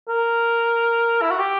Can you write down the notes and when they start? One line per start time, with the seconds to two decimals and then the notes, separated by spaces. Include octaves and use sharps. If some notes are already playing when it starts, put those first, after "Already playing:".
0.08 A#4
1.22 E4
1.31 F#4
1.39 G4